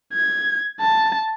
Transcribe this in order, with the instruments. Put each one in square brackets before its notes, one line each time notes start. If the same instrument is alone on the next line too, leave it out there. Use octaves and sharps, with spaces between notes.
[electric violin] G#6
A5